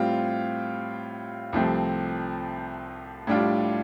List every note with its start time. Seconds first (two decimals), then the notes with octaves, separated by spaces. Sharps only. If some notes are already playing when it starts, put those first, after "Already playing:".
Already playing: A2 G3 C4 F4
1.53 C2 C3 F3 A3 C4
3.27 A2 G3 D4 F4